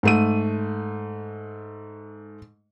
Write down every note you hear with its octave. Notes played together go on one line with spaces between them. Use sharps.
G#2 A3 D#7